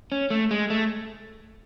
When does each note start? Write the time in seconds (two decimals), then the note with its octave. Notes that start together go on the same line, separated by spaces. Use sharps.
0.12 C#4
0.30 A3
0.51 G#3
0.70 A3